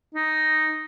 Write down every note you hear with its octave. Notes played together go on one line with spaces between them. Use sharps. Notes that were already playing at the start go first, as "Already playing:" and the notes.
D#4